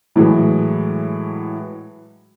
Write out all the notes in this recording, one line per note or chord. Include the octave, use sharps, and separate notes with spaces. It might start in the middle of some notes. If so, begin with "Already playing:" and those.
A2 E3 F#3 G#3